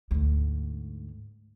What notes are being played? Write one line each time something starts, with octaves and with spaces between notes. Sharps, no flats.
D2 G#2